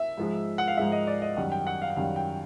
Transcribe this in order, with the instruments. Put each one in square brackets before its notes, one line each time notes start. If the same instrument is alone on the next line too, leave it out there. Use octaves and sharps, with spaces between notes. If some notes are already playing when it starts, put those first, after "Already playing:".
Already playing: [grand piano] E5
G#2 F3 G#3
F#5
F5
G#2 F3 G#3 E5
D#5
D5
D#5
F#2 D#3 G3 F#5
G5
F#5
F5
F#5
F#2 D#3 G3 F5
G5